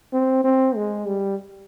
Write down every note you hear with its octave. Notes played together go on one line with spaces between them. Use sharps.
C4
C4
G#3
G3